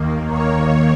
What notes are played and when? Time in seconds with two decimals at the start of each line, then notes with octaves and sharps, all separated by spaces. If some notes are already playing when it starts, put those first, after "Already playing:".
Already playing: D#2 D#3 A#3
0.26 C#5